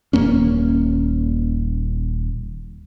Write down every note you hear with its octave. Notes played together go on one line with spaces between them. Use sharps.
D#1 G#2 A#3 C#4